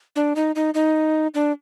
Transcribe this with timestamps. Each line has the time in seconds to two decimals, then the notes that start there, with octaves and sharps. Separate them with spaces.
0.16 D4
0.36 D#4
0.56 D#4
0.74 D#4
1.34 D4